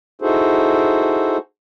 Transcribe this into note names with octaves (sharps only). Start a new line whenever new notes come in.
D#4 E4 F#4 G#4 A4 C5